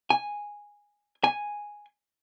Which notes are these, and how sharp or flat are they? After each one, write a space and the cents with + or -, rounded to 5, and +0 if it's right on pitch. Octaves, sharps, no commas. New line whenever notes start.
G#5 -10
G#5 -5